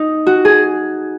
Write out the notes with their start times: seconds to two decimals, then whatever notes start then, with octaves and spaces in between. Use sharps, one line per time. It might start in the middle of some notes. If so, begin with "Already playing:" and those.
Already playing: D#4
0.27 F#4
0.45 G#4